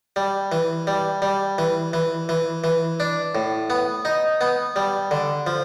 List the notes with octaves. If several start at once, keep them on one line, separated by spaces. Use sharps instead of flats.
G3
E3
G3
G3
E3
E3
E3
E3
D4
A2
B3
D#4
B3
G3
D3
F3